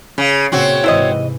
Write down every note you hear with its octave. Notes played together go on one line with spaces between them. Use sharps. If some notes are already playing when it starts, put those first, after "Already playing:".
C#3
A#2 C#3 C4 F#4 C#5
G#2 C3 E3 E4 C5 D#5